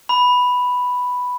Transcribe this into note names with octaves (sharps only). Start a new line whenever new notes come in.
B5